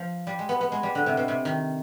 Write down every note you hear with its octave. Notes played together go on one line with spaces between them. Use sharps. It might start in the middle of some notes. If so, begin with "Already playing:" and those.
Already playing: F3
G3
G#3
B3
B3
G#3
G3
D3
C3
B2
C3
D#3